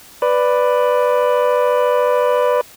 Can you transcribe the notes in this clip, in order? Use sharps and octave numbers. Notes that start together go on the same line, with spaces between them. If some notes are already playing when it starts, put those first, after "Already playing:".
B4 D5